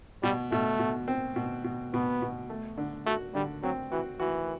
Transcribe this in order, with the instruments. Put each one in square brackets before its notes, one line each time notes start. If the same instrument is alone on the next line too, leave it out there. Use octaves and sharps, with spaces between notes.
[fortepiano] B2 [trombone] G3
[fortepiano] B2 [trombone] A3
[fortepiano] B2
C4
B2
B2
[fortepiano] B2 [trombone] B3
[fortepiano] B2
A3
D3
[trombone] A3 [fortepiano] F#4
[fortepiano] D3 [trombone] G3
[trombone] F#3 [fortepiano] C4
[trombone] E3 [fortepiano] F#4
[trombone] E3 [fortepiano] F#4